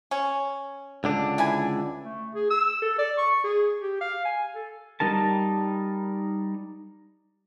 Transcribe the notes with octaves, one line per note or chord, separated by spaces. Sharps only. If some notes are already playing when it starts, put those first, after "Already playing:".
C#4
C#2 D3 D4
E3 B4 G#5
A3
G#4
E6
A4
D5
C#6
G#4
G4
F5
G#5
A4
G3 D#4 A#4 A5